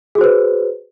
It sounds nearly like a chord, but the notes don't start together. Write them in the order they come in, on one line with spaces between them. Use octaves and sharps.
G#4 F#4 C5 B4